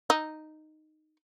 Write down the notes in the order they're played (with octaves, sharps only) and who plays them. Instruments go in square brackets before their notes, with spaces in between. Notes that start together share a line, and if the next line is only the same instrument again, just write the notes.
[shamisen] D#4